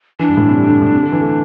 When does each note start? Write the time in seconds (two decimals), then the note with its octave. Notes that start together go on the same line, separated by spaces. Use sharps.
0.19 E3 D4
0.28 G2
0.37 A2
0.47 C3
0.56 G3
0.68 D3
0.81 A2
0.93 C3
1.03 D3
1.12 E3
1.21 A3